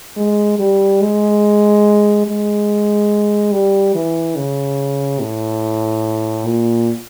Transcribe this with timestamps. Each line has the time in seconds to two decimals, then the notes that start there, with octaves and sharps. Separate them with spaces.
0.17 G#3
0.59 G3
1.01 G#3
2.27 G#3
3.52 G3
3.95 E3
4.36 C#3
5.20 A2
6.46 A#2